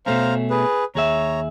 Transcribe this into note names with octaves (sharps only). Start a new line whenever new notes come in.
B2 A3 C#4 C5 F5 A#5
G#4 B4
D#2 G#4 C#5 E5 A#5